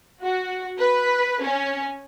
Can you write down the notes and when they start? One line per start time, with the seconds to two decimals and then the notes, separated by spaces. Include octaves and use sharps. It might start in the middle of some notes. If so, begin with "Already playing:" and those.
0.22 F#4
0.78 B4
1.42 C#4